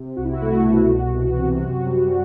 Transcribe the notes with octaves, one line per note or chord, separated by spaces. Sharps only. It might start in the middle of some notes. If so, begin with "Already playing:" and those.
Already playing: C3
C2 F#4
E4
F#4
A3
B2
C2
E3
C3
F#2
G3